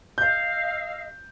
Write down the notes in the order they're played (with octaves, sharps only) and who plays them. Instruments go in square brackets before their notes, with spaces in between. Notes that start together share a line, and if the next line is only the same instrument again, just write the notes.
[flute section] D#5 F5 E6 [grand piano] G6